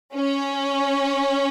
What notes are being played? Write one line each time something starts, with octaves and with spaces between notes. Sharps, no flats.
C#4